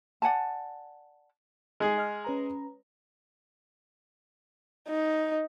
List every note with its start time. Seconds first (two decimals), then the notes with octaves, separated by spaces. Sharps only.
0.22 D5 F#5 G#5 A5
1.80 G#3 D#4 G#4 D#5
1.98 D#5 F6
2.25 C#4 B4 A#5
4.89 D#4